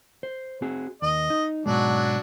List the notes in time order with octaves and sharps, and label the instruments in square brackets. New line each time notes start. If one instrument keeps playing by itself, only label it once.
[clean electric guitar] C5
C4 F#4 G#4
[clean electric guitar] D#2 [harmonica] D#5
[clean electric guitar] D#4
[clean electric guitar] G#2 B2 G#3 [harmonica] F#3 D4